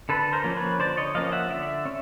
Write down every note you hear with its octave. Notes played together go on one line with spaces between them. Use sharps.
D3 A4 B4
A#4 C5
F3 A#3 C#4
B4 C#5
D3 C5 D5
C#5 D#5
F3 A#3 C#4 D#5 F5
E5 F#5
D3 D5 E5
C#4